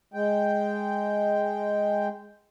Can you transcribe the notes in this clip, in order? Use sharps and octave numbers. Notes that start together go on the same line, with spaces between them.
G#3 G5